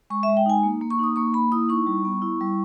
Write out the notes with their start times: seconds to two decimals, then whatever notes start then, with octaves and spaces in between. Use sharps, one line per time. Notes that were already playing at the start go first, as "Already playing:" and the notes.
0.10 G#3 C#6
0.23 E5
0.28 G#3
0.37 G5
0.46 D#4 G#5
0.63 A#3
0.81 A#3
0.90 C#6
0.99 D#4 D#6
1.16 A#3 C#6
1.33 A#3 B5
1.52 E4 D#6
1.69 D#4 C#6
1.86 G3
2.05 B3
2.22 E4
2.41 G3